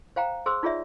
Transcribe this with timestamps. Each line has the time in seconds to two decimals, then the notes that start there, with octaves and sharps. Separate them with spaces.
0.16 C5 F5 G5 A#5
0.46 G#4 C5 C6 E6
0.63 D#4 F4 G#4 C#5 D5 E5